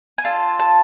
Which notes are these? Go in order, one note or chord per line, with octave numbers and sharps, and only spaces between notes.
G#5
D4 F4 A4 A5
A5